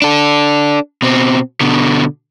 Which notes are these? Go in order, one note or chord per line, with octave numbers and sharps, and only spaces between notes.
D4 A4
B2 C4
B2 D3